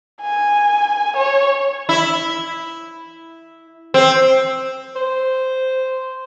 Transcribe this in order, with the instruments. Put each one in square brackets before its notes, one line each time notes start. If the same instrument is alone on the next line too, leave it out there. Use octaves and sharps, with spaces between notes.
[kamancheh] G#5
C#5
[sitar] E4
C4
[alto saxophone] C5